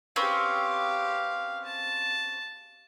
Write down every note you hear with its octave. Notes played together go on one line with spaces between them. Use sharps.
C4 C#4 G4 B4 F5
A5